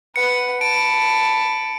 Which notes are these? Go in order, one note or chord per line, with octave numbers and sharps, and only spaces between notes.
B4 F#5 C#7
A5 B5 D7